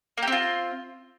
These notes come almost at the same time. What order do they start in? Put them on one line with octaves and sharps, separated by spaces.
A#3 G4 C4 F4